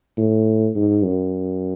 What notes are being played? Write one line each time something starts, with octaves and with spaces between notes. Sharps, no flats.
A2
G#2
F#2